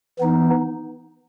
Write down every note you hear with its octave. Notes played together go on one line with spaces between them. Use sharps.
E3 B3 D#4